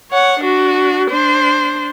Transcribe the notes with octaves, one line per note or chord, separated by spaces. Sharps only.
C#5 F#5
D4 F#4
D4 C5